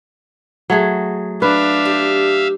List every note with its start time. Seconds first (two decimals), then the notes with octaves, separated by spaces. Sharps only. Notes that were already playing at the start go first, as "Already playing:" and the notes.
0.70 F#3 A3 G#4
1.42 D4 B4 E5 F5
1.85 G4